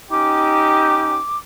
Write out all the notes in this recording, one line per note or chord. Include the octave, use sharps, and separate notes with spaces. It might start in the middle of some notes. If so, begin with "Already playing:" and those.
C#4 D#4 G4 D6